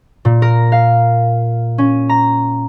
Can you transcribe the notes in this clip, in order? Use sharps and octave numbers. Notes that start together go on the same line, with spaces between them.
A#2
A#4
F5
C#4
A#5